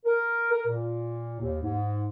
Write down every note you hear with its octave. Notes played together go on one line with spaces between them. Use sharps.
A#4
A#4
A#2
D#2
G#2